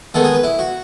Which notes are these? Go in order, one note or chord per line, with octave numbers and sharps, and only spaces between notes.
D#3 G#3 B3 A4
G#4
B4
E4
F#4